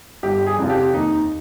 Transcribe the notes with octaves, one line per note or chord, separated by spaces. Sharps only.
G1 G4
G#4
F2 C3 F4
G4
D#2 D#4